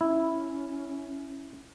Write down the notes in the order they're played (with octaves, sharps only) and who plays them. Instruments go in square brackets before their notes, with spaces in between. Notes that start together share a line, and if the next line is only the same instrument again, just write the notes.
[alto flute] C#4 [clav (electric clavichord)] E4